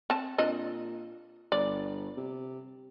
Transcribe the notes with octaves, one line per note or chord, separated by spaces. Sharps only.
C4 A5
A#2 C4 D4 D#5
G1 D5
C3